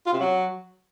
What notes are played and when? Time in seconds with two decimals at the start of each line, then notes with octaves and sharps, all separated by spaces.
0.05 F4
0.12 C3
0.19 F#3